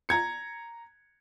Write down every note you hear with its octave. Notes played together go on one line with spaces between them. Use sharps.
A#5 G#6 C#7